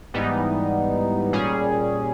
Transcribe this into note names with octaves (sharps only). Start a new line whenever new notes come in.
G#2 E3 G3 B3 D#4
A#2 G3 C#4 G#4